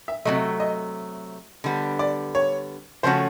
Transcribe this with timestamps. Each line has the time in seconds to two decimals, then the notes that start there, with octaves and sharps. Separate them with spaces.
0.08 E5
0.25 C3 D#3 F#3 A3 D#5
0.60 D#5
1.64 D3 G3 B3
1.99 D5
2.35 C#5
3.03 C#3 F3 A3 C#4 F#4 C5